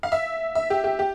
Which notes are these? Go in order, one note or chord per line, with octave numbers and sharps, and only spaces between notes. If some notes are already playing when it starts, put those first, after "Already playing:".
F5
E5
E5
G4
G4
G4